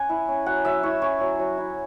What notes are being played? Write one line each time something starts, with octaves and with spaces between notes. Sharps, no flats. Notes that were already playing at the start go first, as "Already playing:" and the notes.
Already playing: C#4 F#5 G#5
E4
C#4
F#3 F#5
F#3 E5
E4 C#5
C#4 C#5
F#3
F#3
E4